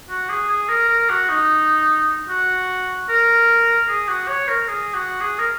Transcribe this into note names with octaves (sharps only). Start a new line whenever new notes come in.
F#4
G#4
G#4
A#4
A#4
F#4
D#4
F#4
A#4
G#4
F#4
C#5
A#4
G#4
F#4
G#4
A#4